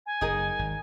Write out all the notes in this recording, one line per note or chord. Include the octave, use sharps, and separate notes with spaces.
G#5
F#1 D#4 G#4 A#4
G#1